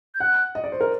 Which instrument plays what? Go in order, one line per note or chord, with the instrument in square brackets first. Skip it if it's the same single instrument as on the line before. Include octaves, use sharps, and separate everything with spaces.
[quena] G6
[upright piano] F#5 [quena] F#6
[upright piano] D#5
D5
C5
A#4